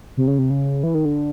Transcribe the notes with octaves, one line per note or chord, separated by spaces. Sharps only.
C3
C#3
C3
C#3
E3
D#3
D3